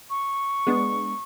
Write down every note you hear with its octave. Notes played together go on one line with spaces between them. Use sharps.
C#6
G#3 B3 D4